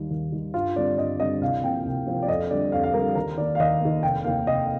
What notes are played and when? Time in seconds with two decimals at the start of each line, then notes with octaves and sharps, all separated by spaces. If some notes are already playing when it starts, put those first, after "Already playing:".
Already playing: D#2 D#3 G3
0.11 D#2
0.32 D#3 G3
0.54 G2 F4
0.76 D3 G3 C4 D5
0.98 G2 D#5
1.20 D3 G3 C4 D#5
1.41 C2 F5
1.63 C3 F3 A#3 G5
1.85 C2
2.06 C3 F3 A#3
2.23 D5
2.28 F2 D#5
2.51 D3 G3 D5
2.72 F2 F5
2.84 F5
2.94 D3 G3 A#4
3.15 D#2 A#4
3.37 D#3 A#3 D5
3.55 F5
3.60 D#2 D#5
3.81 D#3 A#3
4.03 F1 G5
4.24 D#2 D#3 A#3 F5
4.47 F1 D#5